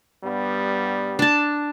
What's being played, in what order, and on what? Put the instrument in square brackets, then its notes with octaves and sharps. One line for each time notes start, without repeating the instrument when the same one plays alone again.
[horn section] G2 G3 B3
[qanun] D4 A5